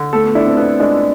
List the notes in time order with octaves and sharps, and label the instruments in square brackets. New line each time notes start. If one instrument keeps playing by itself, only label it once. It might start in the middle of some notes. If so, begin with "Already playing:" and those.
Already playing: [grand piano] D3
[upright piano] A3 [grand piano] A4
[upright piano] B3
[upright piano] D4 [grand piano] E4
[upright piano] C4
[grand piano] B3 [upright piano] D4
[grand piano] G#3 [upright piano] D4